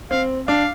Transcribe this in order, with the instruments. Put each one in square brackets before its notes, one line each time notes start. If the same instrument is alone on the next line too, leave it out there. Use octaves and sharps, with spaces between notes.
[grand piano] C4 [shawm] F5
[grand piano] D4 [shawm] F5